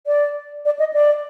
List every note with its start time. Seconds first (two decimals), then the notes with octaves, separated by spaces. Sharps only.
0.06 D5
0.65 D5
0.79 D#5
0.93 D5